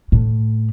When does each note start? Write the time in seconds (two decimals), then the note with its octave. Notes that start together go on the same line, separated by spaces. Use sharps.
0.12 A2